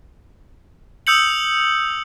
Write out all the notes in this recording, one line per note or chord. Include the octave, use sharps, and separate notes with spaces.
D#6 E6 G6 C#7 F#7